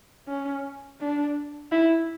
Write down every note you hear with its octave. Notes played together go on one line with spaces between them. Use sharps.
C#4
D4
E4